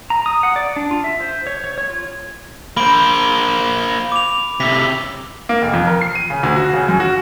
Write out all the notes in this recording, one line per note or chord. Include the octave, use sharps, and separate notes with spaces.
A#5
D#6
F#5
D5
D4
F4
E5
C5
C#5
C#5
C#5
F4
A#3 C5 B5 D7
D6 F7
A2 C3 B6
A#3
F1
F2
A#4
C7
D#7
C#3
D2
F#4
C#3
F#2
F#4